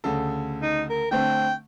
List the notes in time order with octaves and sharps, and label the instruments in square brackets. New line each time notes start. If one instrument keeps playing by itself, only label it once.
[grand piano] D2 C#3 A4
[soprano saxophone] D#4
A#4
[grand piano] D3 A3 C4 [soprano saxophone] G5